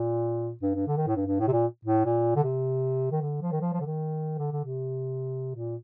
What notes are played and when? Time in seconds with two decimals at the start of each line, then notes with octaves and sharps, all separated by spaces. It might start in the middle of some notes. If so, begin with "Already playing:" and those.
Already playing: A#2
0.62 G2
0.75 G2
0.87 D3
0.97 D#3
1.07 A2
1.16 G2
1.27 G2
1.40 A2
1.48 C3
1.52 A#2
1.85 A2
2.05 A#2
2.36 D3
2.44 C3
3.11 D#3
3.21 D3
3.42 F3
3.52 D#3
3.61 F3
3.73 F3
3.80 D3
3.86 D#3
4.38 D3
4.52 D3
4.65 C3
5.55 A#2